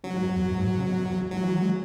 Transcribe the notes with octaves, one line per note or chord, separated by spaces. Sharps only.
C#3 F#3
G#2
F#2
E2
F#2
G#2
G#2
C#3
B2
F#2
E2
F#2
G#2 F#3
E3
E3
G#3